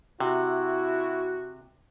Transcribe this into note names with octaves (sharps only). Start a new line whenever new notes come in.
C3 E4 F#4